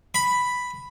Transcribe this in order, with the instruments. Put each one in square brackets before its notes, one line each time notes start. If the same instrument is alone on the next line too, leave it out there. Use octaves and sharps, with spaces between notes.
[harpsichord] B5